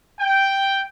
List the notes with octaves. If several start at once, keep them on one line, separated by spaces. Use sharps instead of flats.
G5